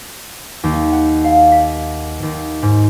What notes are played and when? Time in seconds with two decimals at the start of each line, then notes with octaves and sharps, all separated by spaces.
0.64 D#2
0.93 F#5
1.24 F5
1.52 B6
2.23 D#2
2.62 G#2